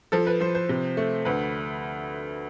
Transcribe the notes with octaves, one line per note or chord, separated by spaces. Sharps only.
F3 A4
B4
F3 C5
C5
C3
A3
D2 B4